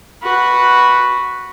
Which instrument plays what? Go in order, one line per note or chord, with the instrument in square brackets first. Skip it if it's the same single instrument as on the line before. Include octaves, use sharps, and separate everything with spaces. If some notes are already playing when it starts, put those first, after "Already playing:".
[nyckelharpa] F#4 B4